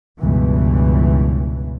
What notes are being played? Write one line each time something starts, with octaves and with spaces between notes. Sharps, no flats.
C#2 G2 B2 E3